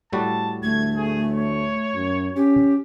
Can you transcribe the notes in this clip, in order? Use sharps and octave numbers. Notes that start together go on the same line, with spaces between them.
A2 G3 F#4 A5
D2 A3 G#6
G#4
C#5
F#2
C#4 G4